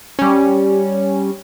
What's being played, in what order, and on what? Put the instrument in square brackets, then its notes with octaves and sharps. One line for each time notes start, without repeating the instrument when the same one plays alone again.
[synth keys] G3 C#4